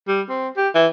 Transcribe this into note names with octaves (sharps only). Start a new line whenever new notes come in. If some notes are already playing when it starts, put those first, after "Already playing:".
G3
C4
G4
E3